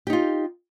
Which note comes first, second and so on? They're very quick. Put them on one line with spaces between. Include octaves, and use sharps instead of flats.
G4 D#4 F4